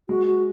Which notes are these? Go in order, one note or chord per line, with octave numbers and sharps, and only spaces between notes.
G#3 F#4
F#4